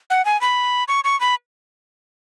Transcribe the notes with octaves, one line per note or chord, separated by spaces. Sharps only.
F#5
G#5
B5
C#6
C#6
B5